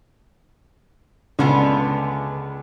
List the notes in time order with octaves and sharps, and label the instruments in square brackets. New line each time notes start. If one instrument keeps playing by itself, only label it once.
[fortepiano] C#2 [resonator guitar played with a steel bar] D3 B3 F4